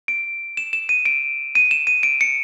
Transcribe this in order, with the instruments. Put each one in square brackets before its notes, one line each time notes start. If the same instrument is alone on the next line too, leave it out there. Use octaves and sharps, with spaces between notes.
[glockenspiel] D7
E7
E7
D#7
D7
D#7
E7
D#7
D7
C#7